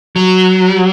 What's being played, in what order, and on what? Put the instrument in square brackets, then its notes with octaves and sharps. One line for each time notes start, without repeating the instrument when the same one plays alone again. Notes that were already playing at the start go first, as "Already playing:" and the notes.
[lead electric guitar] F#3